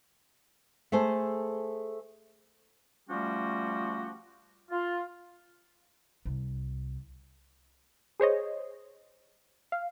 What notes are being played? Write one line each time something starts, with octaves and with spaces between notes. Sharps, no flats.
A3 G#4 A4 C5
F3 G3 A3 C#4 F#4 G4
F4
C2
G#4 C5 C#5 D#5
F5